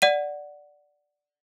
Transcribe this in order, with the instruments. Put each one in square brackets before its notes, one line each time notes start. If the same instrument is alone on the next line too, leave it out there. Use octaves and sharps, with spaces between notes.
[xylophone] D5 F#5 D#7